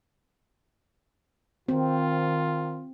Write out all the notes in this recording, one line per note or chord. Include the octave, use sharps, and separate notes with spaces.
D#3 C4 F4